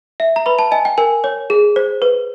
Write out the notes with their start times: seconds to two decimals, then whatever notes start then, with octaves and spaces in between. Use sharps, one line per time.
0.20 E5
0.36 A#5
0.46 B4 B5
0.59 A5
0.72 D#5 G#5
0.85 G5
0.98 A#4 G#5
1.24 C#5
1.50 G#4
1.76 C5
2.02 B4